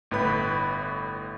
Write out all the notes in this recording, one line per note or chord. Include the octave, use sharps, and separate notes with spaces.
G1 A2 B4 B5